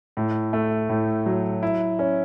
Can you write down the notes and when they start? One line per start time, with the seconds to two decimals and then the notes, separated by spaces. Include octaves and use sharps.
0.17 A2
0.53 A3
0.89 A2
1.26 F#3
1.63 E4
1.99 C#4